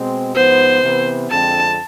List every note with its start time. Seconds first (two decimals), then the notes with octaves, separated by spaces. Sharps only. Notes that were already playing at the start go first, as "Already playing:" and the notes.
Already playing: B2 G#3 C4
0.36 G#2 F3 B3 C5
0.83 C3 E3 B3
1.31 F2 D3 G#3 C4 A5